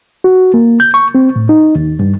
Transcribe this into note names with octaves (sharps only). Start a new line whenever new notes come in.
F#4
A#3
G6
C#6
C4
A2
D#4
D#2
G2